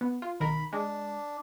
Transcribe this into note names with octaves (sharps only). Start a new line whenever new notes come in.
B3
F4
B1 D#3 A#4 B5
G#3 D4